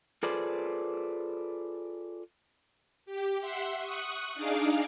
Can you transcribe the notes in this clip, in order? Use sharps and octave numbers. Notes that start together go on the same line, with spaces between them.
F4 G#4 A4 B4 C5 D5
G4
E5 F#5 C6
C#6 D#6 F#6
D4 D#4 G#4 F5 D6